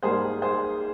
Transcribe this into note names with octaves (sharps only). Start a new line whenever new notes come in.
G#2 G3 A#3 G#4 C5
G#4 C5